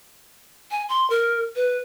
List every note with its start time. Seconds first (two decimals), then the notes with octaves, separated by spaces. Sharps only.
0.71 G#5
0.89 C6
1.10 A#4
1.56 B4